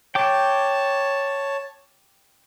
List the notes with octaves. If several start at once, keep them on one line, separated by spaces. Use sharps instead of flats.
C#5 G5 A5 D6